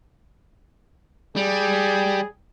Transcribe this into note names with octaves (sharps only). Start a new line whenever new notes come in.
G3 G#4